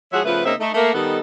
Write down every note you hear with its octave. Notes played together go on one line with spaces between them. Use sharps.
F3 G#3 F#4 G#4 C#5 E5
C#3 F3 A3 B3 B4
C#3 A#3 C4 D#4 E5
A3 D#4
A3 A#3
D#3 G3 B3 D#4 A4